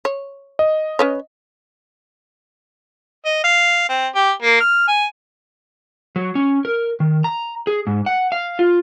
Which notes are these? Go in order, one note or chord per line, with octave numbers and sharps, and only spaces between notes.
C#5
D#5
C#4 B4 C#5
D#5
F5
C4
G4
A#3
F6
G#5
F#3
C#4
A#4
D#3
A#5
G#4
G#2
F#5
F5
F4